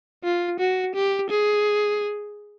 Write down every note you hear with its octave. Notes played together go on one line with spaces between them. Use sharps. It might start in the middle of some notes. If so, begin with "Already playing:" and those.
F4
F#4
G4
G#4